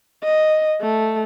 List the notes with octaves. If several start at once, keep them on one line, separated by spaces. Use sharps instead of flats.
D#5
A3